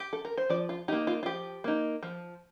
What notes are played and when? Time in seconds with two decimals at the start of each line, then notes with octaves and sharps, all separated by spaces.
0.00 G4
0.13 A4
0.25 A#4
0.38 C5
0.50 F3 D5
0.69 F4
0.88 D#4 G4
0.92 A#3
1.07 F4
1.23 F4
1.26 F3 G4
1.64 A#3 D#4
2.03 F3